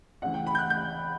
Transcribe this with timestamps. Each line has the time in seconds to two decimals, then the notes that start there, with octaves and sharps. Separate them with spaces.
0.22 D2 C#3 E3 F#5
0.34 G5
0.47 B5
0.55 G6
0.59 F#6
0.70 G6